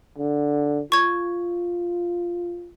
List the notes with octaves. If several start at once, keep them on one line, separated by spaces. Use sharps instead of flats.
D3
F4 C#6 G#6